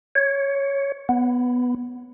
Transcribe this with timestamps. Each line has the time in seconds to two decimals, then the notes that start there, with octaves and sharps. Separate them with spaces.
0.15 C#5
1.09 B3